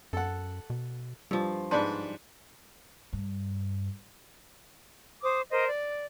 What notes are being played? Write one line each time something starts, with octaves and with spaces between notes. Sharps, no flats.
F#2 A4 F#5
B2
G2 F3 G3
G#2 D4 B4 D5 A5 C6
G2
C5 D6 D#6
A#4 C5 D#5
D5